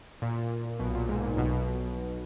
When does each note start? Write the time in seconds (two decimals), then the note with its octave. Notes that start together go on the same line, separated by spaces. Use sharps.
0.22 A#2
0.79 B1 B2
0.95 A#2
1.09 G#2
1.24 A#2
1.37 B1 B2